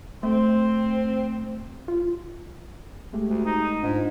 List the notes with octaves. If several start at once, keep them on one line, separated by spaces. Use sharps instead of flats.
A3 C4
F4
G#3 A3 G4
D2
D#4
D#7
G#2 D4 F4 D#5